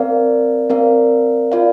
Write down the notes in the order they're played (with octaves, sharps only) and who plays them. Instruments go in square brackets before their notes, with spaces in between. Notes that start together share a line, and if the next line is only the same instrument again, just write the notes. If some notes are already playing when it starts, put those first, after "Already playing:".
Already playing: [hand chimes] C4 A#4 D5 F5
C4 A#4 D5 F5
F4 A#4 D5 F5